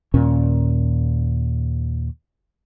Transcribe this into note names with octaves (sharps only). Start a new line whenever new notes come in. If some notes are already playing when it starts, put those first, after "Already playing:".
D#2 A#2 C#4